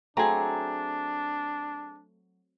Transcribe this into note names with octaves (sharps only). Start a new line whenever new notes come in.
F#3 A3 C4 D4 G#4 A#5